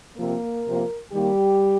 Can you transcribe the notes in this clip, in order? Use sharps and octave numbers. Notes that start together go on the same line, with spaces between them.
C3 F3 A#3 C4 A#4
C3 F3 A#3
D#3 G3 A#3 G4